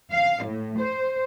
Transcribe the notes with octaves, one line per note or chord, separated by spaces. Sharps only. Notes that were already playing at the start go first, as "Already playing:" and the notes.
F5
A2
C5